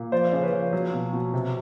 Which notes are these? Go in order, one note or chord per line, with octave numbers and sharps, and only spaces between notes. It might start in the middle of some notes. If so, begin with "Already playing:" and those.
Already playing: A#2
F3 C5 D5
C#3
B4 C#5
F3
F#3
B2
B2
C3